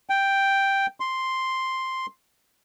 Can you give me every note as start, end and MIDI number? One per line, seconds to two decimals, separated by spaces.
0.10 0.86 79
1.00 2.06 84